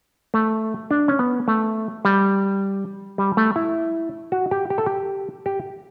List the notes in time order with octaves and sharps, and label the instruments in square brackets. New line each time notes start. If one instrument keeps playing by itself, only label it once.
[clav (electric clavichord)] A3
D4
C#4
B3
A3
G3
G3
A3
E4
F#4
G4
G4
A4
G4
G4